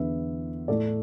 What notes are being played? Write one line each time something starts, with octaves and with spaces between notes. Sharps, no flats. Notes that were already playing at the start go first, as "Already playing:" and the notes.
Already playing: E2 D3 B3 B4 E5
A2 A3 A4 D5